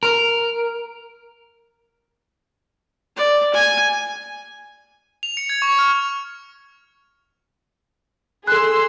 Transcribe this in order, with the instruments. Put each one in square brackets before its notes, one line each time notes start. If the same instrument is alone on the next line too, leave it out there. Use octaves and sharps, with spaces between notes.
[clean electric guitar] A#4
[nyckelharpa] D5
G#5
[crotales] F7
C#7
G#6
C#6
F6
[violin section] G#4 C6 E6 [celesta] A4 F#6